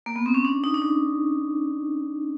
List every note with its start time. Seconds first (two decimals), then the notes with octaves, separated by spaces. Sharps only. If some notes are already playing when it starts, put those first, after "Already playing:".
0.06 A#3
0.16 B3
0.26 C4
0.34 C#4
0.45 D4
0.64 D#4
0.74 D4
0.82 D#4